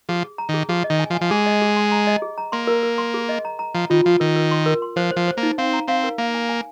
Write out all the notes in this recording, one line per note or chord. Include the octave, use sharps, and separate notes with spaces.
F3 G#4
G#4
A#5
D#3
G#4
F3 G#4
D#5
D#3
G#5
F3
G#5
F3
G#3 G#4
D#5
G#4
C6
A#5
D#5
G#4
A#5
A#3 C6
A#4
A#4
C6
G#4
D#5
A#5
A#5
F3 A#5
D#3 F4
F3 F4
D#3 A#4
A#4
C6
A#4
C6
F3 C5
C5
F3
C5
A#3
D#4
C4 F5
A#5
C4 F5
A#4
A#3 F5
G#5
G#5